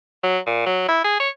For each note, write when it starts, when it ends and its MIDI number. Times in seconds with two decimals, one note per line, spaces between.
0.23 0.38 54
0.47 0.65 46
0.66 0.87 54
0.88 1.02 64
1.04 1.17 68
1.20 1.29 73